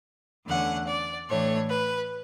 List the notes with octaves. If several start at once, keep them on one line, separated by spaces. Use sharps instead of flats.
E2 D3 A3 C#4 F#5
D5
A2 E3 A3 D4 C#5
B4